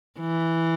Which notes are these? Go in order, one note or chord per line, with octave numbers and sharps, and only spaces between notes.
E3